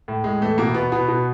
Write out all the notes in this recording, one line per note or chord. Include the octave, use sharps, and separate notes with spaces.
A2
A2 G#3
E3 A3
B2 A#3
B2 B3
B2 B3
B2